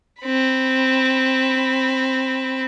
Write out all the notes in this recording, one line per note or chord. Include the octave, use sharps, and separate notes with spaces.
C4 B5